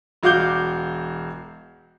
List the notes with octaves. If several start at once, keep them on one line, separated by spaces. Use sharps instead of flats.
E1 F#4 F5 D6 G6 G7